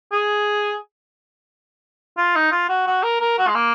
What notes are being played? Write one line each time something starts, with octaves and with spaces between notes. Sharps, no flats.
G#4
F4
D#4
F4
F#4
F#4
A#4
A#4
F#4
G#3
A#3